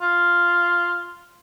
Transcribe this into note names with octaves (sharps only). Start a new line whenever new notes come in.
F4